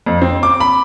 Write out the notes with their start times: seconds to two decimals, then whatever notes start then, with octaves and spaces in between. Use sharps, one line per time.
0.06 F2
0.22 C4
0.43 D6
0.60 B5